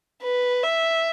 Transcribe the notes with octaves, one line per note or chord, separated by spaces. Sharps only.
B4
E5